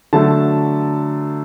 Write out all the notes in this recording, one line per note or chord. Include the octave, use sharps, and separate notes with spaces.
D3 F#3 A3 A5